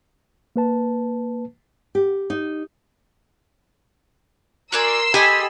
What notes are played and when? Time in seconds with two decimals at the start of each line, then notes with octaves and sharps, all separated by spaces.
0.56 A#3 B4 A5
1.95 G4
2.30 D#4
4.72 F#4 A#4 D5 G#5 C6 E6
5.14 G4 A4 D#5 G#5 B5